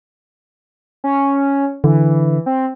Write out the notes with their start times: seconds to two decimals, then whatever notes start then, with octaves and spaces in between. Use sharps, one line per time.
1.04 C#4
1.84 D3 E3
2.46 C4